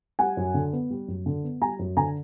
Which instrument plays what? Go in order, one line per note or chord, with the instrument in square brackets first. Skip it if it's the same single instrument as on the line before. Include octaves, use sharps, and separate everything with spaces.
[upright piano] G3 F#5 G#5
F#2
D3
B3
G3
F#2
D3
B3
G3 G#5 A#5
F#2
D3 G#5 A#5